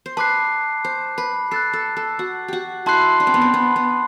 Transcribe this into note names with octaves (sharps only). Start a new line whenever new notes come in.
C5
B4 A5 D6 F#6 C7
C5
B4
A4 F#6 A6 C7
A4
A4
F#4
F#4 G4
E4 A5 C6 F#6 C7
D4
C4
B3
C4
B3
B3